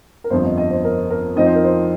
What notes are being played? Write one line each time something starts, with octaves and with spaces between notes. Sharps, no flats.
A#4
G1 F2 F3 C5
D#5
D#5
C5
A#4
A#4
F2 F3 C4 D#4 D#5
C5
A#4
C5